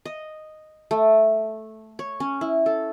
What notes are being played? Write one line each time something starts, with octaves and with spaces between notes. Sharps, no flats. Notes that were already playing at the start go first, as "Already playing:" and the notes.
D#5
A3
C#5
C#4
E4
A4